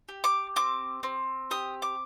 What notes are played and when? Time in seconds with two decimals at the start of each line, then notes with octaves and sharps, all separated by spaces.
0.09 G4
0.24 D6
0.56 C4 D6
1.03 C4
1.51 G4 D#6
1.82 D6